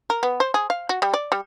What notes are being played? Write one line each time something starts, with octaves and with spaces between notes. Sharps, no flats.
A#4
B3
C5
G#4
F5
F#4
G3
D5
G3